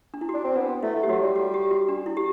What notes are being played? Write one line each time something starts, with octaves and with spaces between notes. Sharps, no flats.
D4
E4
F#4
D4
C4
B3 D4
A3 E4
A3
G4
F#3 F#4
G3
F#4
G4
F#4
D4
E4
G4